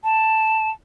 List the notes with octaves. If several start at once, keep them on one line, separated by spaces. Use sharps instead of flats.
A5